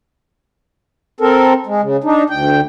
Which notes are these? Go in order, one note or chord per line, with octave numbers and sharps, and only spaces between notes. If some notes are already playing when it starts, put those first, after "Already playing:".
C4 A4 A#4
G#3
C#3
D4 D#4
D2 G5